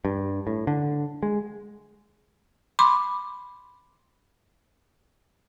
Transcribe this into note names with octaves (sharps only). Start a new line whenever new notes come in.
G2
A2
D3
G#3
B5 C6 D6